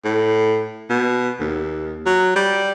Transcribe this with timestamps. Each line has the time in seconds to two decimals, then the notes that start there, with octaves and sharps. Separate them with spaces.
0.04 A2
0.89 B2
1.40 D#2
2.06 F#3
2.35 G3